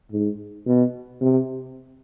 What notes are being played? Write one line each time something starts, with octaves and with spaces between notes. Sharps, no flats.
G#2
B2
C3